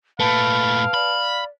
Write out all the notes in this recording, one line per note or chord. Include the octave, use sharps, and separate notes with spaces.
A#2 A3 B4 F5 A5 B5 D7
D5 B5